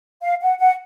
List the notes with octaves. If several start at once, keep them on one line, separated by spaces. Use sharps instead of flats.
F5
F#5
F#5